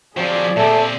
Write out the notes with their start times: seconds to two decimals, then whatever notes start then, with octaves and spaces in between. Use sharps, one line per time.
0.17 F3 F#3 C4 G#4 D5
0.56 A#2 A3 C4